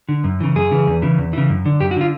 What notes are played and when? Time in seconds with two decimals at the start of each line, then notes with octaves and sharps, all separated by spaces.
0.09 D3
0.24 F#2
0.40 C#3 E3
0.55 F#2 G#4
0.71 C#3 E3
0.87 E2
1.02 C#3 E3
1.18 E2
1.33 C#3 E3
1.50 F#2
1.66 D3
1.80 F#2 G4
1.91 F#4
1.97 D3 F4